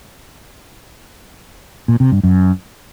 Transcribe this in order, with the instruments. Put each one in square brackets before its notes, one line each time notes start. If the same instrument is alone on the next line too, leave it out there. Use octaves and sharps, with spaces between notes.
[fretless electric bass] A#2
C3
G2
F#2